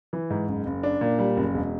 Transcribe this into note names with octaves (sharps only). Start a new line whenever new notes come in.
E3
G#2
F#1
F#1
D4
A#2
G3
F#1
E1